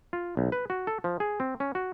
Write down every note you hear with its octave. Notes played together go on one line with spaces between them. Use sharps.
F4
B1
B4
F#4
A4
F3
G#4
C4
C#4
F#4